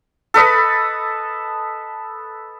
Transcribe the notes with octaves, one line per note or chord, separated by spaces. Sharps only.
A4 B4 D#5 B5